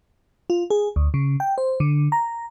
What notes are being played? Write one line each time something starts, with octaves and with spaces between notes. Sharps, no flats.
F4
G#4
D2
C#3
G5
C5
D3
A#5